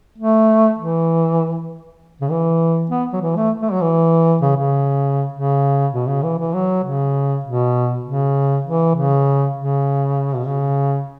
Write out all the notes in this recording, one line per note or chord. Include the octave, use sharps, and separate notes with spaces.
A3
E3
C#3
E3
B3
F#3
E3
A3
A3
F#3
E3
C#3
C#3
C#3
B2
C#3
E3
E3
F#3
C#3
B2
C#3
E3
C#3
C#3
B2
C#3